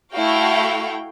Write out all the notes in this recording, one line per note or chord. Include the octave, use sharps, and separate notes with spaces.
A3 E4 F#4 F5 G5